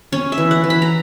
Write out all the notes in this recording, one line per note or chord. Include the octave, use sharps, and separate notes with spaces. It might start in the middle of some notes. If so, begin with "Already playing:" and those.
C#4 C#5
E5
E3
F#5
E3
B5
A#5